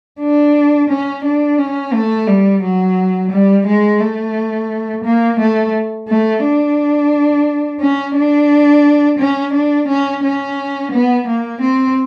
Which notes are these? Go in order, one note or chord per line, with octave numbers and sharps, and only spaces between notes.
D4
C#4
D4
C#4
A3
G3
F#3
G3
G#3
A3
A#3
A3
A3
D4
C#4
D4
C#4
D4
C#4
C#4
B3
A#3
C4